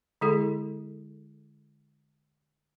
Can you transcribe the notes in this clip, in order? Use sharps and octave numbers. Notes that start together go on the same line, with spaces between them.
D3 G#3 E4 G#4 A4